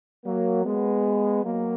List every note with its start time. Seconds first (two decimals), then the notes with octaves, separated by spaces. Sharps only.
0.24 F#3 A#3
0.64 G#3 B3
1.44 F#3 A#3